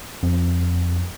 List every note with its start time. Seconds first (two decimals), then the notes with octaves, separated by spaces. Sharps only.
0.23 F2